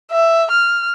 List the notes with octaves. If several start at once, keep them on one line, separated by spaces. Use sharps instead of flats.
E5
F6